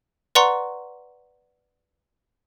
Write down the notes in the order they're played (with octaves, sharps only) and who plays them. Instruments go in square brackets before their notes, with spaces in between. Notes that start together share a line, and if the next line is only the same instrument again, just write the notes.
[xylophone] B4 D5 F#5 A#5 C6 C#6